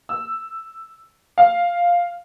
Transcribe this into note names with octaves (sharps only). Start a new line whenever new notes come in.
E6
F5